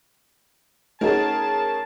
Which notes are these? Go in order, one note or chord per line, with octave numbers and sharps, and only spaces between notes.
A3 C#4 D#4 F#4 G#4 A#4 A5